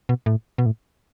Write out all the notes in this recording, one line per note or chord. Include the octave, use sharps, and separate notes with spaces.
B2
A2
B2
A2